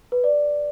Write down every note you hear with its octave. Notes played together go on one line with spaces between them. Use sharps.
B4
D5